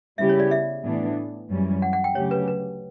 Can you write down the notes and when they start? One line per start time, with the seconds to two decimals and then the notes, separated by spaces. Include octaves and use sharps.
0.18 C#3 G3 B3 E4 G4 E5
0.29 C#5
0.40 D5
0.51 E5
0.84 A2 E3 B3 D4
1.49 F#2 E3 G3 C#4
1.82 F#5
1.93 F#5
2.04 G5
2.15 D2 C#3 F#3 C#4 G4 C#5
2.31 B4
2.48 B4